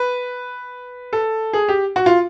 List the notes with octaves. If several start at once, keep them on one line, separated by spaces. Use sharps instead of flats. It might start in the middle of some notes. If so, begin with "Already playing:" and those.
Already playing: B4
A4
G#4
G4
F#4
F4